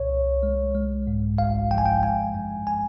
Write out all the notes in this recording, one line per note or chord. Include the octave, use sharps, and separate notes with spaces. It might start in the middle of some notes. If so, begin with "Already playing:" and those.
Already playing: C2 A#2 C#5
C2
G#3
G#3
G#2
G#1 F5
F3 G5
G#5
G5
G#3 G#5
G2
G#5